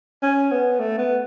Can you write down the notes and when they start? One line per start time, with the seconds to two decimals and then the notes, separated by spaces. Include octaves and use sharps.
0.23 C#4
0.51 B3
0.79 A3
0.98 B3